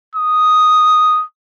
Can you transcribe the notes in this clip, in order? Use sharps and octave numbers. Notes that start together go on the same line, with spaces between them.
D#6